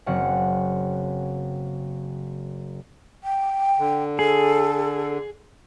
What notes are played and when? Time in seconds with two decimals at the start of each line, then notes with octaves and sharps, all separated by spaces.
0.06 F#1 C#3 C4 F#5
3.24 G5
3.79 D3
4.19 G#4 A4